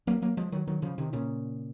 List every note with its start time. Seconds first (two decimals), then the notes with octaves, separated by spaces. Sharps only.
0.07 F#3 A#3
0.22 F#3 A#3
0.37 F3 G#3
0.52 D#3 F#3
0.67 D#3 F#3
0.82 C#3 F3
0.98 C3 D#3
1.13 A#2 C#3